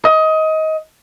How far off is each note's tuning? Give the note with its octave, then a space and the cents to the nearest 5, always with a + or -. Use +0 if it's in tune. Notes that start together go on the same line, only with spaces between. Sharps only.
D#5 +20